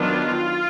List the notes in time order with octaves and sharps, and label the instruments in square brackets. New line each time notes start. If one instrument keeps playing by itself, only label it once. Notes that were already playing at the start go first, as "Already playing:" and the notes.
Already playing: [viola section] D#3 F#3 B3 D4 F4